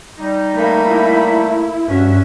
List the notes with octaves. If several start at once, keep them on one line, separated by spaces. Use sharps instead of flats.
G3 D#4
A3 A#3 B5
E4
G2 C#4 F#4 E5